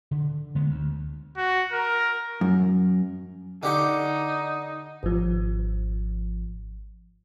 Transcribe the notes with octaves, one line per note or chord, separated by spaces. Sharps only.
D3
D3 G#3 B3
D2
F#4
A#4
F#2
D3 D#4 G4 C#6
G#1 F3